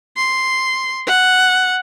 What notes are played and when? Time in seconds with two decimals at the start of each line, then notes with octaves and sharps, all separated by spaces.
0.17 C6
1.07 F#5